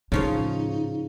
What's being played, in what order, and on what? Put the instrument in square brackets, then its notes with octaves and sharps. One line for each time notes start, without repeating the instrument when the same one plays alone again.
[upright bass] A2 [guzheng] C#3 F3 C#5 [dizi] D#4